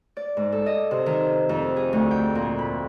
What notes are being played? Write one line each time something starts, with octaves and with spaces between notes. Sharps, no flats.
D5
G#2
A4
D#5
C3
D#3
F2
G#4
D2
G5
A#2
B5